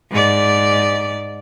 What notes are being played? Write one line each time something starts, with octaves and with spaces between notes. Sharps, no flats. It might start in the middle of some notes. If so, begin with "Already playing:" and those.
G#2 D5